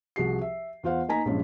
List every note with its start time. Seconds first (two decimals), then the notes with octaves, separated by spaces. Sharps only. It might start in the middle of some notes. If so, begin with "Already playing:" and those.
0.16 C2 F3 F#4 G#4 C7
0.41 E5
0.83 E2 F4 C5 F5 F#5
1.09 A#3 D#4 G#5 A#5 B6
1.25 A#1 G2 G#3 C#4